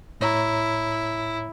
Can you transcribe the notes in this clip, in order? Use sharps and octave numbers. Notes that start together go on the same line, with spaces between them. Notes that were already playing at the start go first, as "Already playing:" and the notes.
A2 E4 C#5 A#5